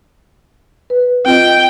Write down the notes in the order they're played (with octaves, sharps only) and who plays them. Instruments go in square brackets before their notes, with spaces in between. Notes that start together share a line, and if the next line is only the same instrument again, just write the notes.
[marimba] B4
[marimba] C4 F4 D#5 [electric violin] G5